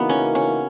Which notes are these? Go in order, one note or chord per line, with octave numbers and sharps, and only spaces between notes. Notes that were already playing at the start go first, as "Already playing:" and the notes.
Already playing: C#3 E3 A#3 B3 D#4 F#4
C#4
C#4